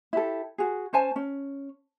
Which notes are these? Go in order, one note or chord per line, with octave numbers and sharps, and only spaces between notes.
E4 G4 A4
F#4 G#4
C#4 C5 G#5 A5
C#4